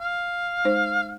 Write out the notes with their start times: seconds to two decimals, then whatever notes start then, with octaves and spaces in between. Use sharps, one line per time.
0.01 F5
0.65 G#3 D#4 C5